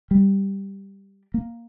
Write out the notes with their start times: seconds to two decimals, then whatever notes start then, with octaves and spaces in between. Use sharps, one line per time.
0.11 G3
1.34 A#3